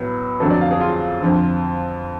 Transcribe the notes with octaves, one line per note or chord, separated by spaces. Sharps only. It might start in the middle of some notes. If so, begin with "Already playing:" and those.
Already playing: A2 F#3 B3
F2 D3 F#3 A3 A4
D5
F5
G#4
F4
F2 D3 F3